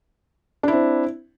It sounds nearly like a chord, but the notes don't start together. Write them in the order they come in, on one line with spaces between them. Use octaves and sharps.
D4 E4 C4